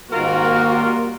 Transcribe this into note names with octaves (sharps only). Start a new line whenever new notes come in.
G#2 D#3 G3 A#3 F4 F#4 A#4